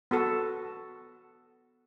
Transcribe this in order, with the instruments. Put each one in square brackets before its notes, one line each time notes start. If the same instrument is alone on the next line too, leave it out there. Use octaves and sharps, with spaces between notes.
[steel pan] B3 F#4 A4